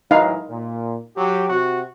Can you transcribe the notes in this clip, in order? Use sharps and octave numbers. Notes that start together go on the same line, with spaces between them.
A2 E3 F#3 D#4 F5
A#2
F#3 G4
C3 F#4